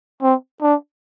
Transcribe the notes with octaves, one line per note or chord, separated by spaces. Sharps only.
C4
D4